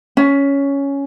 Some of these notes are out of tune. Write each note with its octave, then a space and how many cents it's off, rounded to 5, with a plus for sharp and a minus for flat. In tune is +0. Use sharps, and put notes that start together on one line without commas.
C#4 +5